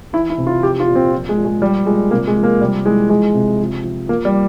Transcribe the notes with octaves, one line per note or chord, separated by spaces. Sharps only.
E3 E4
E4
C3
F4
F3 G4
F4
A#2
C4
F3
G#3
A#2
G#3
F3 G3
A#2 G#3
C3 A#3
G#3
F3
A#3
C3 G3
E3 G#3
F3 G#3
C3
F3
F3
F3 A#3
G3